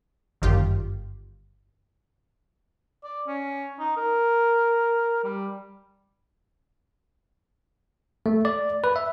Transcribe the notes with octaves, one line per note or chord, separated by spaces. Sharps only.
G1 F#2 D#3 F4 G4
D5
C#4
D#4
A#4
G3
A3
D5
B4
E5